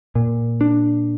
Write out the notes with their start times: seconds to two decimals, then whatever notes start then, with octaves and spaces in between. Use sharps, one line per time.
0.15 A#2
0.61 D4